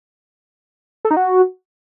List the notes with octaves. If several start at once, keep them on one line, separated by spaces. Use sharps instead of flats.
A4
D#4
F#4